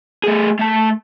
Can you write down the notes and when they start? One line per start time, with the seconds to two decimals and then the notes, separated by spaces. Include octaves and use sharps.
0.24 A3 G#4
0.59 A3 A5